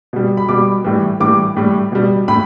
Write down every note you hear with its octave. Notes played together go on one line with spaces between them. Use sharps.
B2 G3
B5
B2 G3 D6
A2 E3 G3
A2 E3 G3 D6
A2 G3
B2 G3
A2 B5